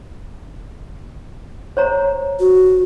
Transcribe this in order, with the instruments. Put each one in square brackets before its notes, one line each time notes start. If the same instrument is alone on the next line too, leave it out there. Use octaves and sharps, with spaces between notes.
[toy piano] C5 C#5 A#5
[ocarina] F#4